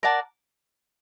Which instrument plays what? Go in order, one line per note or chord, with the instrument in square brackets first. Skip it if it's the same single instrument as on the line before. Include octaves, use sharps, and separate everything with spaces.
[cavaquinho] A#4 D5 F#5 A5